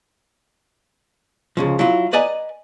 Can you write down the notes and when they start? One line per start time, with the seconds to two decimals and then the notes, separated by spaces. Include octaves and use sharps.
1.57 C#2 C#3 F3
1.79 F#3 E4 F4
2.13 B4 D5 D#5 G#5 A#5